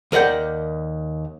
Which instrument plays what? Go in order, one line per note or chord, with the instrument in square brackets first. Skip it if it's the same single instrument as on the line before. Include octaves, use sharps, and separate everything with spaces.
[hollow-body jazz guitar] D#2 A#4 D5 F#5 G5